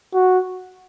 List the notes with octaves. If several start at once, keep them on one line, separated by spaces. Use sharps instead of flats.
F#4